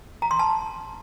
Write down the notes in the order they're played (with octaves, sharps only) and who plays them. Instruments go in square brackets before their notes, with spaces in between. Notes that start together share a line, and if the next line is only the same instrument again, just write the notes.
[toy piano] A#5
C6
A5